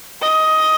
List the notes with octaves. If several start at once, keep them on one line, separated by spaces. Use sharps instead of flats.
D#5